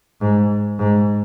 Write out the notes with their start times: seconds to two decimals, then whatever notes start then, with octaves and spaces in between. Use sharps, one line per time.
0.21 G#2
0.79 G#2